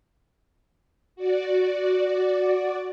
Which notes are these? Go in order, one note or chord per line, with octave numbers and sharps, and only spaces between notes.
F#4 D5